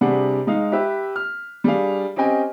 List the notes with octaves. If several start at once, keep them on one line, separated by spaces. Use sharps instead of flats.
C3 G3 D4 G#4 F#5
G#3 D#4 F5
G4 B4 E5
F6
G3 D4 G#4 F5
C4 C#4 G4 D#5 G5 G#5